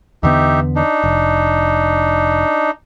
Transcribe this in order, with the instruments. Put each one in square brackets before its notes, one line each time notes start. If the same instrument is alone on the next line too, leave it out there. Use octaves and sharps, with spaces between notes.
[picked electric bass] E2 D3 B3 [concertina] D#4 G4 E5
[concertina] D4 D#4
[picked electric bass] F1